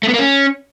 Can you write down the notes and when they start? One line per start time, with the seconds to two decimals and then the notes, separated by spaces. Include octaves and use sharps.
0.03 A3
0.08 B3
0.14 A#3
0.19 C#4